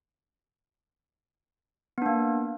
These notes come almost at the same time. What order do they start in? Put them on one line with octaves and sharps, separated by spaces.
B3 D4 A#3